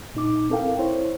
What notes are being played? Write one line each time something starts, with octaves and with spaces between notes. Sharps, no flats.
A#2 D#4 D6
C4 E4 A4 A#4 F5 G5
E4 C5 C#5